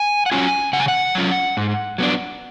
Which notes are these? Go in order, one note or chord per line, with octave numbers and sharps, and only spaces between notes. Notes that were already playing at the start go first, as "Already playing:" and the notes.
Already playing: G#5
F#5
F#3 C#4 F4 G#5
C#3 F#5
G#5
F#5
F#3 C#4 F4
G#2
F#3 B3 D4